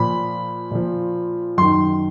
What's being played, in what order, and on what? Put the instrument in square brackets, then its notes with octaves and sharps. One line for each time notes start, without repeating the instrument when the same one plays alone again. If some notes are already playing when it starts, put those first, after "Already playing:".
Already playing: [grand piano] A#2 F3 B5
A#2 F3
F#2 D#3 C6